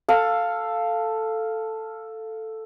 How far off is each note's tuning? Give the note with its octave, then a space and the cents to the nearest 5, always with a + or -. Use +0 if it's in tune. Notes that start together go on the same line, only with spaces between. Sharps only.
A4 +5 F5 +0